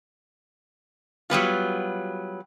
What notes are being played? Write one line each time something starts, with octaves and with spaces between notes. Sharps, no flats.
F#3 G3 B3 F4